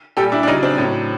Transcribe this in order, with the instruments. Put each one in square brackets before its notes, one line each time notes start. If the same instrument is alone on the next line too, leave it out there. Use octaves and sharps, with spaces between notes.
[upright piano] A#2 G3 G4 A4
D4 E4
D4
C#3 F#3 C#4 D#4
C4 D4
A2 C#4
F#3